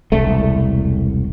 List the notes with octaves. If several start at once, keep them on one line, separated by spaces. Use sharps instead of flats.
E1 C2 A3